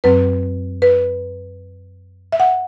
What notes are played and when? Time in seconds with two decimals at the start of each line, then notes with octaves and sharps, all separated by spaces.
0.04 F#2 F#3 C4 B4
0.82 B4
2.32 E5
2.40 F#5